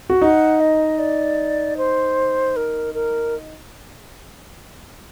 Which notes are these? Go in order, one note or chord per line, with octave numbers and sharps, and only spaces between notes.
F#4
D#4 F#5
D#5
D5
C5
A#4
A#4